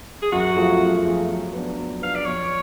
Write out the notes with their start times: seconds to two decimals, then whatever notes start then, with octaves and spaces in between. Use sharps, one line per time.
0.22 G#4
0.32 F#2 F#4
0.56 F3 A3 F4 G#4
0.80 F#2
1.05 F3 A3 F4 G#4
1.29 F#3
1.54 B3 D4
1.78 F#3
2.02 B3 D4 F5
2.15 D5
2.26 F2 C#5